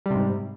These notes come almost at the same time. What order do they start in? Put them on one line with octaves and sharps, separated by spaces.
G3 C3 G#2